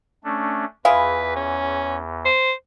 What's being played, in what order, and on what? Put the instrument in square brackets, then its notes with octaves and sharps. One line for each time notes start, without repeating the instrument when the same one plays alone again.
[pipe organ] A3 C#4 D4
[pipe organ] E2 [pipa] E4 F4 G#4 [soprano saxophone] B4
[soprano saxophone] C#4
C5